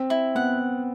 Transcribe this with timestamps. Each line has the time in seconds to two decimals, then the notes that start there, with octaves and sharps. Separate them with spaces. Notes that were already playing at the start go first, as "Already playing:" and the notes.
Already playing: C4
0.10 E4
0.35 B3 F#5